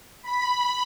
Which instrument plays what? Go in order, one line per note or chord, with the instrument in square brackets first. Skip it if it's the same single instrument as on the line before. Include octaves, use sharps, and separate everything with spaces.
[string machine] B5